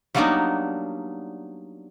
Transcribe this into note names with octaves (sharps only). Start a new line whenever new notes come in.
F#3 G3 A#3 B3 D4 D#4